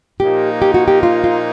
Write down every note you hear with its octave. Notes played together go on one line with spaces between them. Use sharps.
A#2 F3 A#3 D#4 G4
G4
F#4
G4
F4
F4